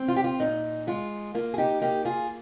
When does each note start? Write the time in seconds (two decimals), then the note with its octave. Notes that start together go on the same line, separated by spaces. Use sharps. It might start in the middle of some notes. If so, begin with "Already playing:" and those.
Already playing: C4
0.08 F4
0.16 G4
0.24 F4
0.40 A#2 D#4
0.87 G#3 F4
1.35 A#3 F4
1.54 G#4
1.58 D#4 G4
1.82 A#3 D#4 G4
2.05 F4 G#4